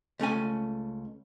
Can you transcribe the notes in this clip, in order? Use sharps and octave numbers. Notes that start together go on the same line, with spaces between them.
C#2 A3 C#4 G#5